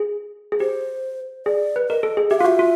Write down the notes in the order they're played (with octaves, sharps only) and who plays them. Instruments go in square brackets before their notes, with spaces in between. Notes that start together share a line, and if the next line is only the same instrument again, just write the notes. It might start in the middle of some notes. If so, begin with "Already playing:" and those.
Already playing: [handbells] G#4
G#4
[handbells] G4 [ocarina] C5
[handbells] G#4 [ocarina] D5
[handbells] B4
[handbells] A#4 [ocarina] D#5
[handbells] A4
G#4
[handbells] G4 [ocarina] E5
[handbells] F4 [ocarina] F5
[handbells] F#4 [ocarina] E5
[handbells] F4